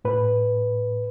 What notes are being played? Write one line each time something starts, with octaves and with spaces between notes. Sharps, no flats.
A2 B4